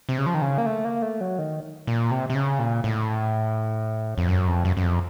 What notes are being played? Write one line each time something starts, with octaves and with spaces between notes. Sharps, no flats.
C3
C#3
F3
D#3
C#3
A#3
A3
A#3
A3
F#3
D#3
A#2
C3
C3
C#3
A#2
A2
F2
F#2
F2
F#2
F#2
F2